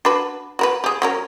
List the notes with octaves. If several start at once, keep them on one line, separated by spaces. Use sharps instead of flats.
D4 F#4 B4
F#4 A#4 B4
G4 G#4
F#3 C#4 A#4